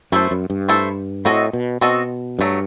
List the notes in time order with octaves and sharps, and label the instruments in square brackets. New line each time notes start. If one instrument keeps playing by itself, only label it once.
[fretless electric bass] F#2 [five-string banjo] A3 E4 A4 C5
[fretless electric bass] F#2
G2
[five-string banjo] A3 E4 A4 C5
[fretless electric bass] A2 [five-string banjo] C4 F#4 A4 D#5
[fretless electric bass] B2
[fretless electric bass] B2 [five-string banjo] C4 F#4 A4 D#5
[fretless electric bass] G2 [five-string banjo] F#3 A3